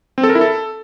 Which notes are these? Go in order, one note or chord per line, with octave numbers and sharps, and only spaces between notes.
C4
A4
A#4
E4
A4